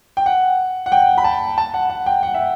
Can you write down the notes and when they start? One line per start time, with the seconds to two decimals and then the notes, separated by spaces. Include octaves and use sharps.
0.17 G5
0.26 F#5
0.86 F#5
0.92 G5
1.18 B5
1.24 A5
1.58 A5
1.74 F#5
1.90 F#5
2.06 G5
2.23 F#5
2.34 E5